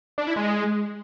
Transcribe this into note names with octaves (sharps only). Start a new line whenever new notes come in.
D4
E4
G#3